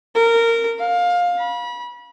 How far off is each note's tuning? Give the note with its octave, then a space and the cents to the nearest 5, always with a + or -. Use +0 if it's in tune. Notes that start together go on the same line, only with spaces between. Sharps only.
A#4 -15
F5 +20
B5 -30